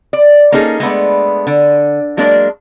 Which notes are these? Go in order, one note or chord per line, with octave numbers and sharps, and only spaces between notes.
D5
A#3 C#4 D#4 G#4 A4
G#3 A3 B3 D4
D3
F#3 G#3 A#3 D4